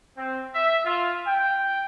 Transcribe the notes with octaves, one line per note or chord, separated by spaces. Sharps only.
C4
E5
F4
G5